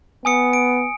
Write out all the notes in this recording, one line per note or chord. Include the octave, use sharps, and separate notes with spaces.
B3 G#5 D#6 C#7
D7